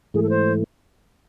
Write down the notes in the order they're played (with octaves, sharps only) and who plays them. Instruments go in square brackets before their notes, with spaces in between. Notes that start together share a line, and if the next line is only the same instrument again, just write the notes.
[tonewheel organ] G#2 E3 A3 [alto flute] G#4
[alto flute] A4
C5